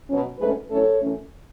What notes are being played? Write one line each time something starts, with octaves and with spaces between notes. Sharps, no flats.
B2 F#3 C#4
G#2 F#3 A3 C#4 G#4 B4
A2 F#3 A3 C#4 A4 C#5
F#2 E3 A3 C#4